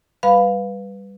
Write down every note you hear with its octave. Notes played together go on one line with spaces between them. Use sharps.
G3 B4 F5 B5